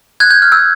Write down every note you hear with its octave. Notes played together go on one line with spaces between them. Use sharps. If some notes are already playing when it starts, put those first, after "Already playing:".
F#6 G#6
G6
F6
E6